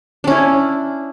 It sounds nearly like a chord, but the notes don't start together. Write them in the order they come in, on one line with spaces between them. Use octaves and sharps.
D4 C#4 E4